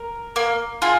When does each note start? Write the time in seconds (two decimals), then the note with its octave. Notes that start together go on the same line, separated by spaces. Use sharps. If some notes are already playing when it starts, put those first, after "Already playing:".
Already playing: A#4
0.36 A#3
0.82 F4 G#4